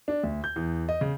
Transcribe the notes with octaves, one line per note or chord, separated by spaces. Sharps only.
D4
D2
G6
E2
D#5
C#3